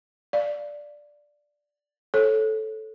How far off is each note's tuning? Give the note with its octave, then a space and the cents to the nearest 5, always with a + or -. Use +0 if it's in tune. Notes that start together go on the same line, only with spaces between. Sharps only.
D5 +0 F5 +0
A4 -10 C#5 -20